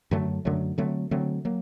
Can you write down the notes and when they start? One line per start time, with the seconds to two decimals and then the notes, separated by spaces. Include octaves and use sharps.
0.11 F#2 D3 F#3 A3
0.45 F#2 D3 F#3 A3
0.78 D3 F#3 A3 C4
1.11 D3 F#3 A3 C4
1.45 F#3 A#3